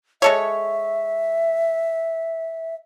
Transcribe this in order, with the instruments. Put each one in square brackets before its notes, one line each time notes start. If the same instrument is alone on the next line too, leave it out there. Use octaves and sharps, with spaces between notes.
[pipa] G#3 A4 C#5 [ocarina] E5